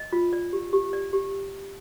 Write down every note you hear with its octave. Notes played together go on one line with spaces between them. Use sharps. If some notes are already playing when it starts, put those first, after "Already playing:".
Already playing: D#5
F4
D5
G4
G4
D5
G4